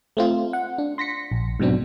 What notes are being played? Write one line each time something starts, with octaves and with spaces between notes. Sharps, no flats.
A3 C4 F4
F#5
D4
C6 A#6 B6 C#7
A#1
G#2 B2 F#3 C4 D4